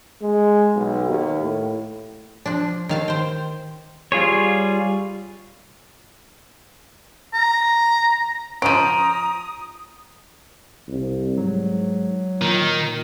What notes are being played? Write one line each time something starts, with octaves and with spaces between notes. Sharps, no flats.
G#3
B1
D#2
A2
F3 D4
D#3 F5 A5
C5 G5
G3 F4 G#4 C#5
A#5
F3 C#4 A#5 D#6 D7 D#7
C2
G#2 F#3
A#2 D#3